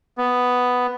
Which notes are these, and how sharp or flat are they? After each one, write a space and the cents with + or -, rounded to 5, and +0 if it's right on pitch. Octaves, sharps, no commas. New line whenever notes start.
B3 +5